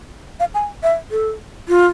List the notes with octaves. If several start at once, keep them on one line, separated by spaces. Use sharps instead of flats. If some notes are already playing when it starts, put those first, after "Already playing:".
F5
G#5
E5
A4
F4